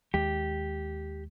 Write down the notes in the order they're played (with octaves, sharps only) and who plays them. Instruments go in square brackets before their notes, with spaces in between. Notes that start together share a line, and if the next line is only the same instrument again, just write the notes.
[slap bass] D#2 G#3 [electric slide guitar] G4